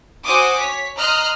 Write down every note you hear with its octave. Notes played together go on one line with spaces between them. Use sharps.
F#4 C5 G#5 D6 D#6
C#5 B6
D#5 A#5 C6 F6 F#6